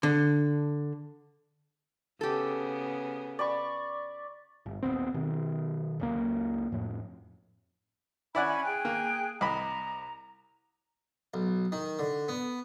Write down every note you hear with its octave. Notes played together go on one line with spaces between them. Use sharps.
D3
C#3 B3 G4 A4
D5 B5 C#6
G1
D#1 F#2 B3 C4
B2 D#3
F#1 C#2 A#3
F2 A2
C#4 E4 D5 F#5 G#5 B5
G#4 G5 F#6
A#3
C2 D#5 A#5 B5
B1
D#3
D3
B3